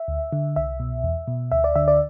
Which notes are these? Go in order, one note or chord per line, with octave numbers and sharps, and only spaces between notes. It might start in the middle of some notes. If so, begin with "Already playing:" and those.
Already playing: E5
D2
D3
C2 E5
B2
E2
B2
D2 E5
D5
D3 E5
D5